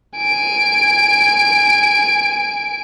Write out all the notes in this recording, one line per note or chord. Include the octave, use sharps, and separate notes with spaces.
G#5 D7